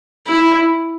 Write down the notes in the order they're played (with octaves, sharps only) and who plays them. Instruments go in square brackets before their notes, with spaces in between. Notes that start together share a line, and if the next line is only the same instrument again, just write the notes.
[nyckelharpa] E4